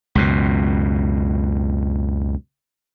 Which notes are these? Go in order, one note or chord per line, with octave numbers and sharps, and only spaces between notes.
C#2 F#2 B2